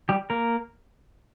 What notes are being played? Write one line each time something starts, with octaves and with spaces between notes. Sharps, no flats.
G3 G4
A#3 A#4